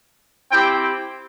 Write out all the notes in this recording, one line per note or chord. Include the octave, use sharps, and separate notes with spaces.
C4 E4 G4 G5